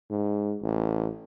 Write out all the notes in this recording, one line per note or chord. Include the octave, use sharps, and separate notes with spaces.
G#2
A1